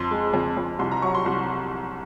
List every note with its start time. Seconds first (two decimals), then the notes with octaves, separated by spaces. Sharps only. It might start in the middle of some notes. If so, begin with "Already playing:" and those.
Already playing: F2 C6
0.11 G#3
0.34 F2
0.57 F2
0.79 C2 C6
0.91 A#5
1.02 F#3 C#6
1.15 C6
1.26 C2